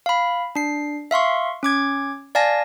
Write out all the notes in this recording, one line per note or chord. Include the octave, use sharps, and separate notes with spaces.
F5 B5
D4 C7
E5 F5 C6 C#6
C#4 D6 G#6
D5 F5 G#5 A5 A#6